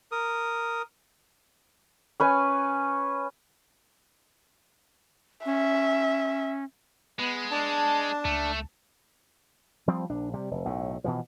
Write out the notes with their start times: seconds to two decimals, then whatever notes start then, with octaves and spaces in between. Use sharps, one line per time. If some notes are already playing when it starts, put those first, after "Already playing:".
0.12 A#4 D#6
2.20 C#4 B4 G#5
5.46 C#4 E5
7.19 G#3 B3
7.51 D4 A5
8.25 C#2 A3
9.88 F3 G3 C4
10.09 A#1 D4
10.34 C3 G3
10.51 F1
10.65 B1 A2
11.04 B2 E3 F3